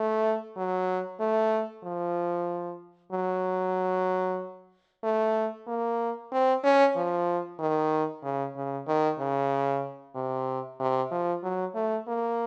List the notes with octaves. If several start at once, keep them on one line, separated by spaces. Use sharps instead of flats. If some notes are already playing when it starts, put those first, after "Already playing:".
Already playing: A3
F#3
A3
F3
F#3
A3
A#3
C4
C#4
F3
D#3
C#3
C#3
D#3
C#3
C3
C3
F3
F#3
A3
A#3